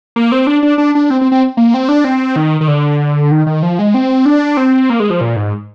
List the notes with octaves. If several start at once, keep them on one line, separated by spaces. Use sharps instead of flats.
A#3
C4
D4
D4
D4
D4
C4
C4
C4
A#3
C4
D4
C4
D#3
D#3
D3
D#3
D#3
F3
G#3
C4
D4
C4
A#3
G#3
F3
A#2
G#2